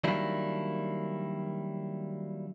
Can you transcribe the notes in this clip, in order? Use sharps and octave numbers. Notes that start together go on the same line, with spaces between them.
D#3 F#3 G3 A#3 D4 E4